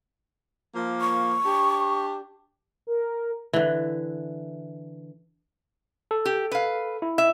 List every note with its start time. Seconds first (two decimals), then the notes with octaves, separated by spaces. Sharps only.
0.75 F3 A#3
1.01 C#6
1.45 D4 G4
2.87 A#4
3.53 D3 E3
6.11 A4
6.25 G4
6.51 B4 F5
7.02 E4
7.18 E5